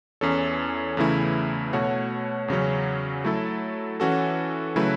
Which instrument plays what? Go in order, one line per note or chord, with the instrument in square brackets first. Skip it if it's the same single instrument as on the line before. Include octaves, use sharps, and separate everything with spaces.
[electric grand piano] E2 E3 C#4 A4 C#5
E2 C#3 E3 A3 E4
B2 A3 F#4 C#5
E2 C#3 F#3 C#4
F#3 A3 E4 A4
E3 C#4 F#4 A4
C#3 F#3 A3 E4 B4